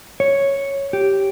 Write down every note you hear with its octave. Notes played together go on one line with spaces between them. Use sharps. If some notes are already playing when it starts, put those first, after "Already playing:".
C#5
G4